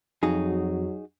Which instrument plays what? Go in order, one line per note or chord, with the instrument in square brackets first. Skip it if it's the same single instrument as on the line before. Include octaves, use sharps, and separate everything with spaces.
[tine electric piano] F2 [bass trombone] F#3 [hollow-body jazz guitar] D#4 F#4 G#4